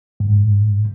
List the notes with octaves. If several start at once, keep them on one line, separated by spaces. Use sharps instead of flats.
G#2